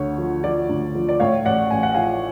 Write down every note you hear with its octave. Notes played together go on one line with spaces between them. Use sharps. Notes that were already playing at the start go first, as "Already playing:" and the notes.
Already playing: D2 D3 C#5
F3
F3 D5
D2
F3
D5
A2 C#5 F5
A1 D5 F#5
A1 G#5
F#5
F3 F5 G#5